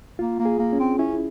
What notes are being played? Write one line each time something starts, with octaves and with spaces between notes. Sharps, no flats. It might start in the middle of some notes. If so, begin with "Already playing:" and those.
A#3 F4
A#3
G#4
A#3
C#4
C4
C#4 E4